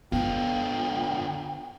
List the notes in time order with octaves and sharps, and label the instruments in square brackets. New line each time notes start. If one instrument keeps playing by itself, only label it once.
[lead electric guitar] D3 F4 [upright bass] B3 [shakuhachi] G5